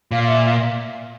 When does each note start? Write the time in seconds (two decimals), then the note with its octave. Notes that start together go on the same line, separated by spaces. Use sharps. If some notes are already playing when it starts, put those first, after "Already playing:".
0.11 A#2 F5
0.23 F5
0.28 E5
0.45 F5